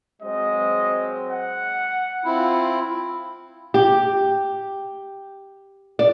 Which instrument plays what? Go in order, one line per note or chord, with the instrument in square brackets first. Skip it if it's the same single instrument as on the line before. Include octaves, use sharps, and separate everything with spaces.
[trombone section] F#3 G#3 C4 [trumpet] D#5
[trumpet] F#5
[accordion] C4 E4 [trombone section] F4
[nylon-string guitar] G4
D5